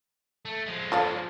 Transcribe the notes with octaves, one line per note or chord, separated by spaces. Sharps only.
A3
F3 G#3
F4 A4 D5